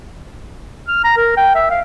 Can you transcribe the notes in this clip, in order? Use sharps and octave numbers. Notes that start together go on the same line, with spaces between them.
F6
A#5
A#4
G5
E5
F5